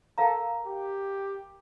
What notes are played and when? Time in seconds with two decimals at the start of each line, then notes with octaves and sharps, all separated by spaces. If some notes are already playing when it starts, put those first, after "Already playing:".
0.18 A4 A#4 F5 A#5
0.66 G4